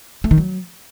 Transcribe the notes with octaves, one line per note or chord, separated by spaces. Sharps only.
A3
D#3
F#3